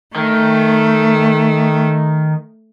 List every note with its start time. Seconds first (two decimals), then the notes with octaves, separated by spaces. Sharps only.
0.16 D#3 A3